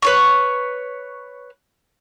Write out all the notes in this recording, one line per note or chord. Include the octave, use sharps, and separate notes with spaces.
B4 C#5 C#6